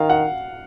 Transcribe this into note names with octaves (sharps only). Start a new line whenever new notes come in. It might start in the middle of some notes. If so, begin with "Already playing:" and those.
Already playing: D#3 F5
F#5